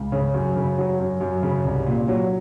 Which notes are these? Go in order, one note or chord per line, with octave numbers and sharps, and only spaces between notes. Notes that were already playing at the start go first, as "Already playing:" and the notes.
Already playing: C#2
C#3
F#2
C#3
F#3
F#2
F#2
C#3
C2
A#2
F#3